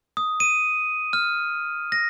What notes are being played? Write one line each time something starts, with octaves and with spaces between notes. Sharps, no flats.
D#6
D#7
F6
A#6